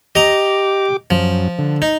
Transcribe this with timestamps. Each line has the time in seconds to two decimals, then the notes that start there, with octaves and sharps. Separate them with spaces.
0.15 G4 D#5 A#5 D6
1.11 F#2 F3
1.59 D3
1.82 D#4